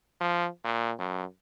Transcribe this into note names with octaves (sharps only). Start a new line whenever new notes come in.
F3
A#2
F#2